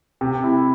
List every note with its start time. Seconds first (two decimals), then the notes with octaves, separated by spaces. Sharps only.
0.21 C3
0.43 E4